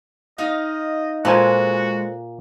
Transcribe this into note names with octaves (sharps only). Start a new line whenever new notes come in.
D#4 D#5 F5
A#2 G#3 F#4 A4 C5 G#5